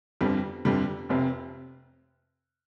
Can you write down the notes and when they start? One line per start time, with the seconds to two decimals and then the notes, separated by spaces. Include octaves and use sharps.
0.21 G1 F2 D3 G3
0.65 G1 F2 D3 G3
1.09 F1 F2 C3